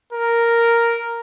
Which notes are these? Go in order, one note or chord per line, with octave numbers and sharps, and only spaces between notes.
A#4